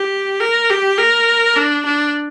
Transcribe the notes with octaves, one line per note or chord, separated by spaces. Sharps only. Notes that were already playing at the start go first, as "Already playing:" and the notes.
Already playing: G4
A#4
G4
A#4
D4
D4